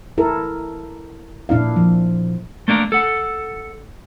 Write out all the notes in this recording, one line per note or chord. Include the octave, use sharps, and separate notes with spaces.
E4 A4 A#4
A#2 D4 E4 F5
F3
A3 A#3 D4 F#4 A#4
A4 F#5